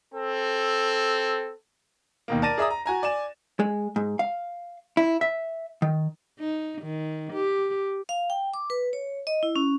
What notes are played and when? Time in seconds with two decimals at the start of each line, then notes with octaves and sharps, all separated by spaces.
0.13 C4 A4
2.28 D#2 B2 A#3
2.42 A#4 D5 A5 A6 A#6 D#7
2.58 G#4 D5 E5 A#5 D#6
2.70 A#5
2.86 F#4 G#5 A#5
3.03 D5 G#5 E7
3.60 G#3
3.96 G#2
4.19 F5
4.97 E4
5.21 E5
5.82 D#3
6.39 D#4
6.82 D#3
7.34 G4
8.09 F5
8.30 G5
8.54 D6
8.70 B4
8.93 C#5
9.27 D#5
9.43 E4
9.56 C#4